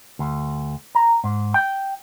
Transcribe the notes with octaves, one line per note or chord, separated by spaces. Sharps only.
D2
A#5
G#2
G5